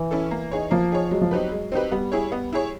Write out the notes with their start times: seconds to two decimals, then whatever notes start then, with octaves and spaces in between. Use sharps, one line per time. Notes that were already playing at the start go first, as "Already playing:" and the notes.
Already playing: E3
0.11 C#4 E4 A4
0.31 A#3
0.52 D#4 G#4 C#5
0.71 F3 A#3
0.91 D#4 G#4 C#5
1.11 F#3 G#3
1.21 F3
1.31 F#3 C4 D#4 G4 B4
1.52 G#3
1.72 C4 D#4 G4 B4
1.92 G3 B3
2.12 E4 G#4 C#5
2.32 B3
2.53 E4 G#4 C#5